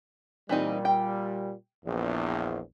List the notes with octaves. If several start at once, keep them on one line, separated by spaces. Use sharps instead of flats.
A#2 E3 G3 C4 D#4
G5
A#1 E2